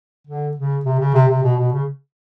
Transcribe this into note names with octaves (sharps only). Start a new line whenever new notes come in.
D3
C#3
C3
C#3
C3
C3
B2
B2
C#3